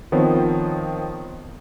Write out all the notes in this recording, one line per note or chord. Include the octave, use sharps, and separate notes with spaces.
D#3 F3 B3 C4 C5 C#5